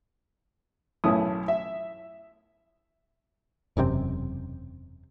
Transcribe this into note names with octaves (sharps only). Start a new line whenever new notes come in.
B1 F#2 A2 C#4 E4 D#6
E5
E1 F#2 C3 C4